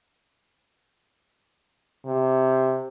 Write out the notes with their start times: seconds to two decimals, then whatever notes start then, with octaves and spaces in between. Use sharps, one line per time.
2.06 C3